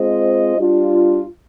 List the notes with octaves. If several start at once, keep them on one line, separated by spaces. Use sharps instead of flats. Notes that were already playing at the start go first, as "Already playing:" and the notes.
Already playing: G#3 C4 F4 C5 D#5
G3 D4 F4